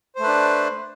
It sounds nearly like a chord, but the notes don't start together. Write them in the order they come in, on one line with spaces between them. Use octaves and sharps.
C5 A3 B4 D4